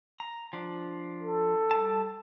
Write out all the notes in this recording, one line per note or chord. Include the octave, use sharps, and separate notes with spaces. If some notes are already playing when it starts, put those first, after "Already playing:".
A#5
F3 D4
A4
G3 A5